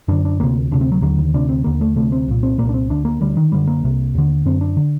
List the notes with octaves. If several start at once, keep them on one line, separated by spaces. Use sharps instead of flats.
F#2 D3 D4
D4
D2 C3 A#3
D2 C3 D4
C4
F#3
D#2 D3 F#3
D#3
D2 C3 D4
C4
D#2 D3 A#3
A3
D2 C3 A3
C4
C2 A#2
C4
C2 A#2 A#3
D4
C4
D2 D3 D4
A#3
D2 D3 G3
D#3
F#2 D3 G3
A#3
C2 C3
D#2 D3
F#2 D3 C4
D4
D3